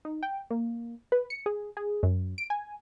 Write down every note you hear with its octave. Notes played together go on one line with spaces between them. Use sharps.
D#4
G5
A#3
B4
C#7
G#4
G#4
F#2
D7
G#5